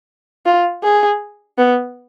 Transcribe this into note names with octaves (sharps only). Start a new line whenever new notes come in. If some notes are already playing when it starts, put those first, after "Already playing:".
F4
G#4
B3